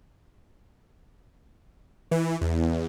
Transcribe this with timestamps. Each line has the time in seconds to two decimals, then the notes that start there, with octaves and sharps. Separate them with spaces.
2.11 E3
2.41 E2